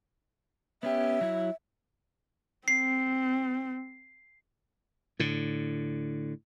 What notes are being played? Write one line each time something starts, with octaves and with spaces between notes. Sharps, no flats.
B3 C#4 G4 E5
F#3 E4
C4 C7
A2 D3